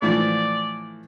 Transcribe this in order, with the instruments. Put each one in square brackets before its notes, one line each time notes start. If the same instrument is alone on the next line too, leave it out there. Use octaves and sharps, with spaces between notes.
[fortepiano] A2 E3 F3 [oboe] D5